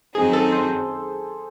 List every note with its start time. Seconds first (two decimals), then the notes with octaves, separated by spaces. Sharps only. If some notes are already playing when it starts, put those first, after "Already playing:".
0.14 F#2 D#3 F#3 C4 D#4 G#4
0.33 A4
0.52 C5